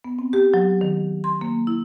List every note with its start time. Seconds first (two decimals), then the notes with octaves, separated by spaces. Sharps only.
0.04 B3
0.19 C4
0.33 G4
0.54 F#3
0.81 D#3
1.24 C6
1.41 A#3
1.67 E4